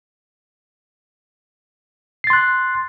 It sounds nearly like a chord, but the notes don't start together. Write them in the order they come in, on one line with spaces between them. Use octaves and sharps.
C7 A6 C6 F#6